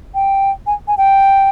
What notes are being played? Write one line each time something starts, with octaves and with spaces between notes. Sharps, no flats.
G5
G#5
G#5
G5